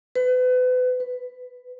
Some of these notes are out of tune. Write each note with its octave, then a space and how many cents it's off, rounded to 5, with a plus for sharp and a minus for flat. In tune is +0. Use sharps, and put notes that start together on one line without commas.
B4 +35
B4 +10